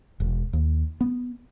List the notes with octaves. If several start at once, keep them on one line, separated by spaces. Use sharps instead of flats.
E1
D#2
B3